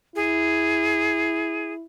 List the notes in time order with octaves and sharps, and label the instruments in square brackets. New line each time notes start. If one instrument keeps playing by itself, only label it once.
[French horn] E4 [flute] G#4